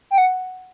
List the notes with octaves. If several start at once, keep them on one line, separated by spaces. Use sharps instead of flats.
G5
F#5